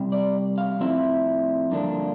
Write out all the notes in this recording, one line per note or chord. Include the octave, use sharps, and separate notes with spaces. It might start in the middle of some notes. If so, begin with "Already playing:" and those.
Already playing: C3 G3
D5
F5
A2 F3 C4 E4 E5
G2 D3 F3 A#3 D4